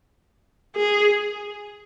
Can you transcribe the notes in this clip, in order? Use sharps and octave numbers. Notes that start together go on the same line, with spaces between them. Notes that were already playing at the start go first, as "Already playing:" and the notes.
G#4